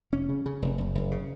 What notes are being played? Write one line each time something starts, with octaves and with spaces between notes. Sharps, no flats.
F1 C#4
C#3
C#3
F1
F#1
F#1
C#3